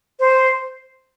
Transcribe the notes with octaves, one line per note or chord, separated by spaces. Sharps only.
C5